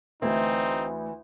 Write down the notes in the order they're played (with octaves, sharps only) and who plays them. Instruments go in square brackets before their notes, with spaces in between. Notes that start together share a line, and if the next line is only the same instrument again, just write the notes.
[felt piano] D2 [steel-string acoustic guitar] E3 [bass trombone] C4 [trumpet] D#4